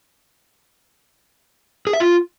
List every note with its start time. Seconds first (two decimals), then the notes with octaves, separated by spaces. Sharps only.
1.87 G#4
1.93 E5
2.00 F4